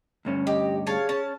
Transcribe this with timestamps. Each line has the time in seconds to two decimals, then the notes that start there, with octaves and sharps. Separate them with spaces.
0.25 D2 G2 C#4
0.47 G4 D#5
0.87 G#4 C#5 F5 A5
1.09 C#4 A5